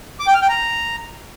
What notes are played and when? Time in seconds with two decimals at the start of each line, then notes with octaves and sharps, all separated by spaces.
0.20 D6
0.27 G5
0.34 F6
0.42 G5
0.49 A#5